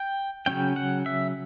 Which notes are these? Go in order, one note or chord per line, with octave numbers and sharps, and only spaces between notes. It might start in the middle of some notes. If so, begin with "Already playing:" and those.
Already playing: G5
C#3 F#3 C#4 G5
F#5
E5